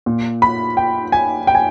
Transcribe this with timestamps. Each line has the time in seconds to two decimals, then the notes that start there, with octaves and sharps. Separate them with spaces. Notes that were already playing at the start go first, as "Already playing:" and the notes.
0.06 A#2
0.42 B5
0.77 G5
1.12 G#5
1.47 G5
1.55 G#5